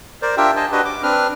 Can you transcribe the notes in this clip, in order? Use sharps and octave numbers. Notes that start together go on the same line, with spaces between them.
A#4 C5 D5
D4 F4 G4 A#4 E5 G5
C5 D#5 G#5 A5
D4 F#4 G4 B4 D#5
D6
C4 D4 B4 F6